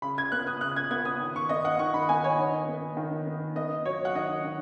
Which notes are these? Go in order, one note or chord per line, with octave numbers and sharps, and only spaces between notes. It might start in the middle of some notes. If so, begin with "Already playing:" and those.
C#3 B5
G#6
B3 F#6
D#6
C#3 F#6
G#6
B3 G#6
D#6
D#3
C#6
B3 D#5
F#5
D#3 C#6
B5
B3 G#5
C#5
D#3 D#5
B3
D#3
B3
B3 D#5
F#3 C#5
F#5
D#3 D#5
D#3